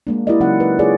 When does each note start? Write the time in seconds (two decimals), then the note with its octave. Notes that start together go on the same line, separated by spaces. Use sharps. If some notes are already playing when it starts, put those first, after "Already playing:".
0.07 G#3 A#3 D4
0.27 D4 E4 G4 A#4 D5 D#5
0.40 C#3 F#3 C#4 D#4 F#4 F#5
0.60 B4
0.79 D#4 F4 G#4 C#5 D5